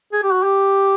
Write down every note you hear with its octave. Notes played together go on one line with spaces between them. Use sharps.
G#4
G4
F#4
G4